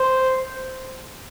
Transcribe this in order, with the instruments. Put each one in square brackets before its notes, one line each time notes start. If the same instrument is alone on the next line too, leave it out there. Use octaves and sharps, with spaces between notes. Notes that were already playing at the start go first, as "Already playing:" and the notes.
Already playing: [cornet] C5